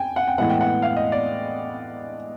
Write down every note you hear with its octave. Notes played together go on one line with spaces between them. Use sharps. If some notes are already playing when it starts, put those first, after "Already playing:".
Already playing: G5 G#5
F#5
G5
A2 E3 G#3 B3 F#5
G5
F#5
F5
D#5
D5